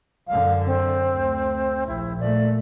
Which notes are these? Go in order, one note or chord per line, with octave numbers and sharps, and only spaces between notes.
F#2 D3 F5
C4
D2
A#1 A#2 E4
A#2 A3 D5